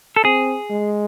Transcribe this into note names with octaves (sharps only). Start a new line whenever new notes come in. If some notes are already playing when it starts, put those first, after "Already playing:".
A4
C4 G#4
G#3